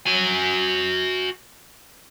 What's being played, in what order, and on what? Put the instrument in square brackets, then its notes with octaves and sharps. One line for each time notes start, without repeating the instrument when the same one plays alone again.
[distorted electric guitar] F#4 G#5